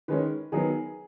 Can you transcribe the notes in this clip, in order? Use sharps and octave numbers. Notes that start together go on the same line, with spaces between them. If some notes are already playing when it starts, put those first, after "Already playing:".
D#3 G#3 C#4 B4
D#3 F#3 B3 G#4